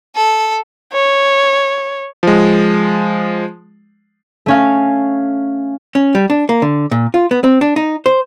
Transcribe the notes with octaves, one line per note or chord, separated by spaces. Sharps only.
A4
C#5
F3 G#3
A3 C#4 F5
C#4
G3
D4
A#3
D3
A#2
F4
B3
C4
D4
D#4
C5